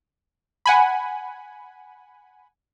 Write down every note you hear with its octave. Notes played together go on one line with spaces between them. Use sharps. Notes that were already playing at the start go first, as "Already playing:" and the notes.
F#5 G#5 B5